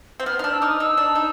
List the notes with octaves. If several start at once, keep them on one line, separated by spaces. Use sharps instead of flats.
C4
B3 F6
D4 D#4 F6
E6
D#4 D6 D#6
D#4 E6
D4
D#4